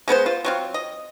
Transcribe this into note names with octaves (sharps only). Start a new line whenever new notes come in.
G#3 B3 B4 C5
F4
F#3 C4 F4
D#5